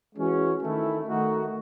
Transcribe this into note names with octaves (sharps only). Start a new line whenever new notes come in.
E3 G#3 C#4 F#4
D#3 A3 E4
D#3 A3 D#4 F#4